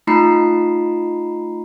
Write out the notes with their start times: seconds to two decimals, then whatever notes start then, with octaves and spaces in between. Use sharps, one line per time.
0.07 A3 D#4 F4 A#5 B5 C7